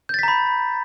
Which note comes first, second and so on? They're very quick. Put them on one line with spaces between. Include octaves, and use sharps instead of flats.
G6 A6 B6 A#5 B5